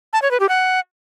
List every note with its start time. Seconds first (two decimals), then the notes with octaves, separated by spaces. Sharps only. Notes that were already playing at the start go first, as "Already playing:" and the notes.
0.13 A5
0.22 C#5
0.31 B4
0.40 G4
0.49 F#5